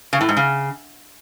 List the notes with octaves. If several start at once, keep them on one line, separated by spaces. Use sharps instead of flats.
C#3
A2
G#2
C#3